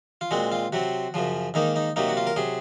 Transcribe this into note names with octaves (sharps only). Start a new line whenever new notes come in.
F4
A#2 G#3 C4 F#4
F4
C3 F#3 C4 F#4
F#2 C#3 F3
G#2 D#3 A#3 D#4
D#4
C3 F#3 A#3 D#4
F#4
F4
A#4
C3 F#3 G#4